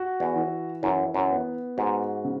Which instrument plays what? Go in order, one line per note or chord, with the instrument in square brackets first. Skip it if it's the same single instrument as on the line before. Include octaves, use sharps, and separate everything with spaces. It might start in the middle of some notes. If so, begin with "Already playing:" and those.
Already playing: [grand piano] F#4
[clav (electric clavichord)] E2
[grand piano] E3
[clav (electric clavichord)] F#2 [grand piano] E3
[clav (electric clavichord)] F#2
[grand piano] B3
[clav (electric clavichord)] G#2 [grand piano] F#4
[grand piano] C#3